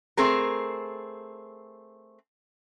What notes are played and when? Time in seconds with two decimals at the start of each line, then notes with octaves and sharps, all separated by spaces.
0.17 A3 C4 G#4 A#4